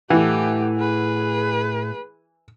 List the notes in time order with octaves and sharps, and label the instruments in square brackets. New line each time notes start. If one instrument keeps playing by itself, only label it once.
[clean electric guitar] A2 F#5 [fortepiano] E3 [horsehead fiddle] A3 G4
[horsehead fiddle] G#4 B4